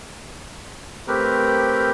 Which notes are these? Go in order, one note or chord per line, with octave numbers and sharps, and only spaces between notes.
A3 C4 G4 A#4 B4